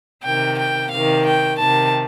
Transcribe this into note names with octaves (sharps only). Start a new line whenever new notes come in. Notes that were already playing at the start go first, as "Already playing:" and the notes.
C3 D#3 G5
G5
C3 D#3 F5
G5
C3 D#3 A5